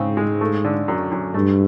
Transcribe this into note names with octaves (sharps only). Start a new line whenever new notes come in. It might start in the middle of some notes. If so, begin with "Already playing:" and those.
Already playing: G#2 C#3 C4
G#3
A3
D3
F#2
F#2
G2 A3